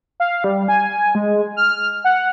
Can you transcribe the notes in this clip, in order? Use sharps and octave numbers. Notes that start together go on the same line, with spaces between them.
F5
G3
G#5
G#3
F6
F#5